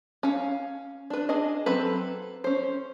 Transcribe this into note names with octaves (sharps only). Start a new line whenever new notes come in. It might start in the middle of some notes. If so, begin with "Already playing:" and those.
C#4 F5
D4 B4
D4 G#4 D#5
F#3 C4 A4 B4
C#4 C5